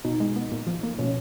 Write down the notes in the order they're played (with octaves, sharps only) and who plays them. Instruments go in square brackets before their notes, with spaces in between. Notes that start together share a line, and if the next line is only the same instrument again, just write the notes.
[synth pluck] B2 [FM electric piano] D#4
[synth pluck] G#3
B3
A#2
F3
A#3
[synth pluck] B2 [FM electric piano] C#4